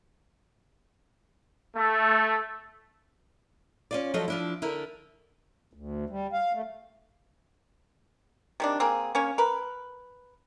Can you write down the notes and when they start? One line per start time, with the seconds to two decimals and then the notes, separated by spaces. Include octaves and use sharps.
1.76 A3
3.91 C#4 F4 D5
4.14 F3 F#3 F4 A4 D#5
4.28 F3 D4 E4
4.62 D3 E4 A#4
5.73 D2
6.10 G3
6.33 F5
6.53 A3
8.60 C3 D#3 D4
8.80 A#3 C4 G#4
9.15 A#3 C#4 C#5
9.38 A#4 B4